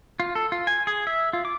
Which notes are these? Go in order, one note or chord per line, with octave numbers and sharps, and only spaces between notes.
F4
A4
F4
G#5
G#4
E5
F4
D6